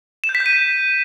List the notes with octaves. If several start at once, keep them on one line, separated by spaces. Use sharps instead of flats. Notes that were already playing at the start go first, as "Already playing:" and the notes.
E7
G6
B6
G6
D#7